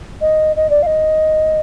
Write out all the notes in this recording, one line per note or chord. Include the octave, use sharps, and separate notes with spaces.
D#5
D#5
D5
F5
D#5